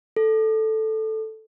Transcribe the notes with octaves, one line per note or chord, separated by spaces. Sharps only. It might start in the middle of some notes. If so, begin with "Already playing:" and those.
A4